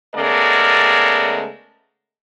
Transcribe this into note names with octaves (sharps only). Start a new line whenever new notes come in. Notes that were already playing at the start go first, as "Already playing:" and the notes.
C#3 G#3 A3 B3 A#4 D5